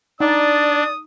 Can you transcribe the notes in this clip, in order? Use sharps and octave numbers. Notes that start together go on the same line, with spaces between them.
D4 D#4 D5 D#6